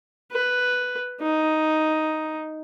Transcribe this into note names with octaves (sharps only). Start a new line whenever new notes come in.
B4
D#4